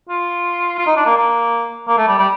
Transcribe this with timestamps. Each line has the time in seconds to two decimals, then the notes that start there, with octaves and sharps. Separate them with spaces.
0.09 F4
0.78 F4
0.86 D#4
0.96 D4
1.05 A#3
1.17 A#3
1.88 A#3
1.98 A3
2.08 G3
2.18 G3